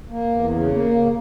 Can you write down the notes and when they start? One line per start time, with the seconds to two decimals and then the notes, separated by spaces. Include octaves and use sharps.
0.10 A#3
0.30 E2
0.51 C#3
0.71 A#3
0.91 C#3